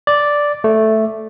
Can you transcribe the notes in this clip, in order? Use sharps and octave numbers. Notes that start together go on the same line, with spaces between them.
D5
A3